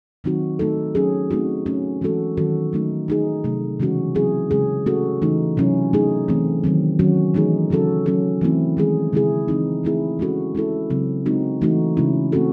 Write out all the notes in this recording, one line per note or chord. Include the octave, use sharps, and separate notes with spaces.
D#3 F#3 C4 D#4 F#4
A3 D#4 A4
F#3 C#4 G#4
A3 C4 D#4 F#4
A3 C#4 F#4
E3 G#3 C#4 F#4 A4
D#3 F#3 C#4 F#4 A4
F#3 A3 D#4
A3 D#4 G#4
C3 F#3 A3
C#3 E3 G#3 C#4 F#4
F#3 C4 E4 G#4
C#3 G#3 C#4 G#4
A3 C#4 F#4 A4
C#3 E3 A3 D#4
C3 F#3 C#4 E4
A3 D#4 G#4
E3 A3 C4
D#3 F#3 C4
D#3 F#3 C#4 F#4
E3 A3 D#4 G#4
C#3 F#3 C#4 F#4 A4
F#3 C#4 F#4 A4
E3 A3 C4 E4
D#3 G#3 C#4 G#4
C#3 G#3 C4 E4 G#4
E3 C4 D#4
E3 A3 C4 E4 G#4
G#3 C#4 F#4 A4
G#3 C#4 E4 A4
C#3 F#3 C4
G#3 C4 D#4 F#4
E3 A3 D#4 F#4
C#3 G#3 C#4 E4
A3 C4 F#4 A4